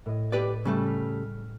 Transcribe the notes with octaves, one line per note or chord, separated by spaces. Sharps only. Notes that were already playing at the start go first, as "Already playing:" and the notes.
A2 D#5
G4 B4 D5
C#3 G3 A3
F6 B6